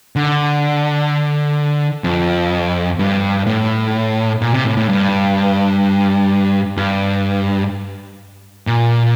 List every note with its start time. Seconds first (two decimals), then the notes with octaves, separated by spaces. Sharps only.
0.16 D3
2.04 F2
2.99 G2
3.47 A2
4.42 A#2
4.53 C3
4.65 A2
4.77 A2
4.89 G2
6.77 G2
8.67 A#2